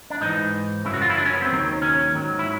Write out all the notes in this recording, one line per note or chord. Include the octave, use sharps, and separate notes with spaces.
D4
G#2 E3 D#4
F#2 C#3 F#3 E4
F#4
F4
E4
D4
C#4
B3
C4
D#2 D#3 F#3
C#4
G#2 D#3 F#3
E4